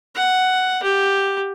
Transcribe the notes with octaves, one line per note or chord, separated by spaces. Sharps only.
F#5
G4